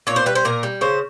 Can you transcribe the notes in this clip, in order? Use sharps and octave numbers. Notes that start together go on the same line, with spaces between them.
A#2 C#5
C5
G3 B4
C5
A#2 A#4
G3
C#3 C5